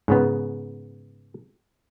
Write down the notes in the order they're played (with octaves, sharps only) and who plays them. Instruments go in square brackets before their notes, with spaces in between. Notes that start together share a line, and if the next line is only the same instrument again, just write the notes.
[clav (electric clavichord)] G#2 C#3 B3